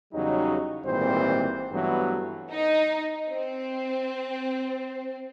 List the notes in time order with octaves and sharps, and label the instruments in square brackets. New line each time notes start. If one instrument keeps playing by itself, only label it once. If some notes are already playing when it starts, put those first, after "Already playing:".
[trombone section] E2 C#3 F#3 G3 D#4
G#1 A#2 E3 G3 C4 C5
G2 E3 F#3 A3 B3
[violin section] D#4
C4